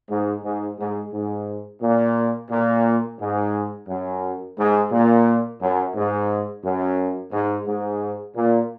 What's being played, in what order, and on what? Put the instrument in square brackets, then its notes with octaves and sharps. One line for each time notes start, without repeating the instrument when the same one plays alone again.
[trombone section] G#2
G#2
G#2
G#2
A#2
A#2
G#2
F#2
G#2
A#2
F#2
G#2
F#2
G#2
G#2
A#2